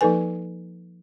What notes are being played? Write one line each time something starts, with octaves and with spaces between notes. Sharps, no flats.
F3 A#3 D#4 A4 B4 G#5